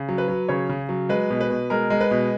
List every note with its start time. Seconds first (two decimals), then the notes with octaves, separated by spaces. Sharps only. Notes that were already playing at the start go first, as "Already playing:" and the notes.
Already playing: C#3
0.09 F#3
0.18 B4
0.28 F#3
0.49 C#3 C#5
0.69 C#3
0.89 F#3
1.09 G#3 B4
1.30 B2
1.41 B4
1.50 B2
1.70 G#3 A#4
1.90 G#3
2.01 B4
2.11 B2